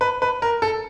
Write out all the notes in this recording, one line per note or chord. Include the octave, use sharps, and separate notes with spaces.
B4
B4
A#4
A4